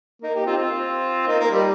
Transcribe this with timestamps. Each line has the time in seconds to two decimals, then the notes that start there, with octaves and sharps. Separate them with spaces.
0.22 A#3 D#4
0.34 D#4 G4
0.46 C4 F4
0.57 C4 F4
1.27 A#3 D#4
1.39 A#3
1.51 G3